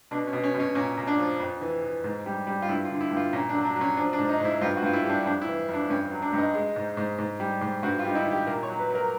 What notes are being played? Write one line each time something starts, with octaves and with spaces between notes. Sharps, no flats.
B2 D4
C#4
B2
C#4
B2
C#4
A#2 C#4
A#2
D4
F3
F2
E3
E3
G#2
G3
G3
F4
G2 E4
F4
D3
E4
G2
F4
A#2 C#4
D4
F#3
D4
F#3
C#4
F3 D4
D4
G#2
D#4
G#2 E4
G2 F4
F#4
G2 F4
E4
G3
D4
F2 D4
E4
E3
F2 D4
G2 C#4
F#3
D4
G2
D#4
G#3
G#2
G#2
G#2
G3
G#2
G2 F#4
F4
G3
D#4
E4
D#3
G4
A#2 A#4
C#5
F#3
B4
F#3
A#4